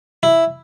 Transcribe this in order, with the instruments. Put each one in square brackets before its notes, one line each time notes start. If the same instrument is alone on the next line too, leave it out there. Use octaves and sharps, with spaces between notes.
[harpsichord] E4